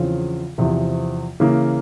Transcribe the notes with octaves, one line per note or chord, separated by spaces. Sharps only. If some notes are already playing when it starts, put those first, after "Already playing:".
Already playing: E2 C#3 F3 C4 F4
E2 C3 F3
C#3 E3 A#3